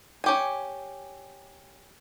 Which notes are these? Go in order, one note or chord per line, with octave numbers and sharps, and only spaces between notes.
C#4 G4 G#5